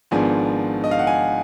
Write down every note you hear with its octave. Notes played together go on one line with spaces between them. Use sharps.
G#1 G#2 F3 B3 D4 G#5
D#5
F5
F#5
G#5